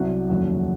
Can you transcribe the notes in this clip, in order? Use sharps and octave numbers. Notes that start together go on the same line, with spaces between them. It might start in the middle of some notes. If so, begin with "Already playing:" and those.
Already playing: C2 C3 F#3 F#4 F#5
F1 D#2 C#3 F#3